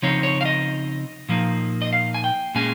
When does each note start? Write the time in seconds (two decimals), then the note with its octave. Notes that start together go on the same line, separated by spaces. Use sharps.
0.02 C#3 F3 C4 D#4 C#5
0.23 C#5
0.41 F5
0.45 D#5
1.29 A#2 F3 A#3 D#4
1.82 D#5
1.93 F5
2.14 G#5
2.24 G5
2.55 A#2 G#3 C#4 G#5